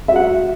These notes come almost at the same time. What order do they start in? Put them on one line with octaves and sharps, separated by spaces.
E5 F#4 F#5